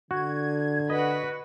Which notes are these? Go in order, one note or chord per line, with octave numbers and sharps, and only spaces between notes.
D3 F#4 G#6
F#4 B4 D#5 B5